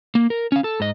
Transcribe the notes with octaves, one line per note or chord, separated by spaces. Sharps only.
A#3
A#4
C#4 F5
A4
G#2 D#5